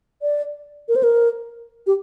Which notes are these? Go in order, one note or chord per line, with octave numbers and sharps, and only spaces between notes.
D5
A#4
C5
A#4
G4